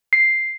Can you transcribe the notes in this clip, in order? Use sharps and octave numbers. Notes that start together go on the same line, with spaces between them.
C7